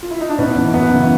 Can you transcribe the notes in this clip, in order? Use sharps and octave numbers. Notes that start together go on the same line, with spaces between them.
F4
E4
D#4
D4
A2 B3 C#4
E3
F#2 B3
C#3 E3